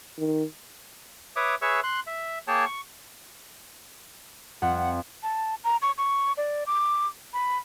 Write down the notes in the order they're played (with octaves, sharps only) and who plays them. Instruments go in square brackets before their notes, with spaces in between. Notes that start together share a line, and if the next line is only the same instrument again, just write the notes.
[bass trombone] D#3
[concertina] B4 C#5 E5 D6 D#6
G#4 B4 C#5 E5 C#6 E6
C6 F#6
E5
A#3 G#4 C#5 G5 A5
C#6
[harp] F2 [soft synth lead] F#5
[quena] A5
A#5
C#6
C#6
D5
D6
B5